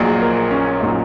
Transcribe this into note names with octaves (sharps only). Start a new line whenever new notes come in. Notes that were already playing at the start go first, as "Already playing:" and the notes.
Already playing: A#1 A#2 F#3 D#4 G#4
A#4
C#4
A#2 F#3 D#4